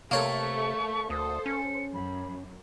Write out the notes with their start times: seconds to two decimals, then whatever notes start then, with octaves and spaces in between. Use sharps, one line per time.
0.11 C3 A3 A#3 C#5 C#6
1.10 D2 A4 C5 D#6
1.46 C#4 C#7
1.94 F#2 B5